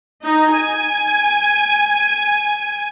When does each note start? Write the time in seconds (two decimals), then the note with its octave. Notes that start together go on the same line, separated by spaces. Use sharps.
0.24 D#4
0.57 G#5